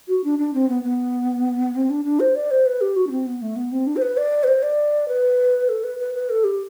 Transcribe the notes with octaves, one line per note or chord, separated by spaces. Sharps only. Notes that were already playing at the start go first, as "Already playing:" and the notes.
F#4
D4
D4
C4
B3
B3
C4
D4
D4
C5
D5
C5
B4
G4
F#4
D4
C4
B3
A3
B3
C4
D4
C5
B4
D5
B4
C5
D5
B4
A4
B4
B4
B4
A4
G4